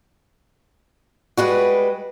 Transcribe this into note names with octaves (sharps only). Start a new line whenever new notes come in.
G3 G#3 F#4 B4